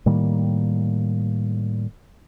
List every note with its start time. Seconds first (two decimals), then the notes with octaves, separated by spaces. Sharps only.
0.06 A2 D#3 G3 A#3